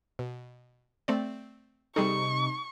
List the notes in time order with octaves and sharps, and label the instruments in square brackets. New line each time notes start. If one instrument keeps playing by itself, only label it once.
[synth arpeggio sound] B2
A3 C4 D5
[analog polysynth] C3 D#4 [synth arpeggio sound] G3 G#4 A4 [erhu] C#6